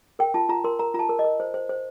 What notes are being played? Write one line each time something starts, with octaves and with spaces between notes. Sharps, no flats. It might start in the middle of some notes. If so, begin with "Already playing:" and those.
A#4 G5
F4 A5
F4 A#5
A#4 C6
A#4 A#5
F4 A#5
A5
A#4
D#5
A#4
C5
C5
C5